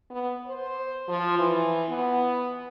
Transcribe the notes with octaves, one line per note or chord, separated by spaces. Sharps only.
B3
C5
F3
E3
B3